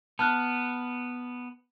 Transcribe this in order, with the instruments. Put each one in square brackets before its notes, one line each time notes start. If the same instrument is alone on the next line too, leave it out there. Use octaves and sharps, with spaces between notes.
[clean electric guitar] B3 [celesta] A5 F6 F#6